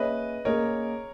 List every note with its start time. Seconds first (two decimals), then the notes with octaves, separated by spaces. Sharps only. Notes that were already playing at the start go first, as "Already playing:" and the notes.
Already playing: A#3 C#4 G#4 B4 C#5 D#5 E5
0.45 A#3 C#4 G#4 A#4 C#5 D#5